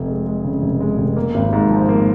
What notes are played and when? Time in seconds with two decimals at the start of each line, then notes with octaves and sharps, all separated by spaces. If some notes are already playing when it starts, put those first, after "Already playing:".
Already playing: F1 F2
0.08 G#3
0.26 G#3
0.44 C#3
0.62 F1
0.80 G#3
0.98 F1
1.17 A#3
1.34 G#1
1.53 G#2
1.70 F3
1.89 A#3